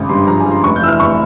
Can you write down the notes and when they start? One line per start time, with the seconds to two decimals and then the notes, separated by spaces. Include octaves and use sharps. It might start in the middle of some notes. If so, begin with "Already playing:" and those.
Already playing: G#1 C#3
0.09 G2 C6
0.27 F3 A#5
0.40 G#5
0.46 F3
0.52 C6
0.64 F1 C#6
0.76 G6
0.82 E3 E6
0.88 F6
1.00 F1 C#6